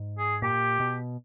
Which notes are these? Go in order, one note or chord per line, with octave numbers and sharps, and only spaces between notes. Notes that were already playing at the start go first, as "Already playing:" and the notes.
Already playing: G#2
G#4
A#2 G4
B2